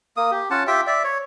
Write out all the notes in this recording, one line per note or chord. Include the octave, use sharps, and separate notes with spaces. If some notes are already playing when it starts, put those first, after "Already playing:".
A#3 D#6
G4
C#4 F4 F#5 A5
F4 G4 E5 G5
D5 E5
C#5